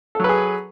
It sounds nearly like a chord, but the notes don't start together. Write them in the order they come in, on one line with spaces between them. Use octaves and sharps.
A4 F#3 B4 G#4